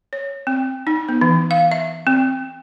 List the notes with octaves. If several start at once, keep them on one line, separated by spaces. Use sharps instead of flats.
C#5
C4
D#4
B3
E3
F5
E5
C4